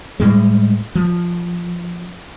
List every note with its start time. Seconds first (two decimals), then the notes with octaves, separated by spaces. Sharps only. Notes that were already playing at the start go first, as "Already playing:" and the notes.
0.20 A2 G3 G#3
0.95 F3